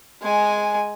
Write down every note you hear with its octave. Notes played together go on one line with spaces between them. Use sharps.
G#3 G#5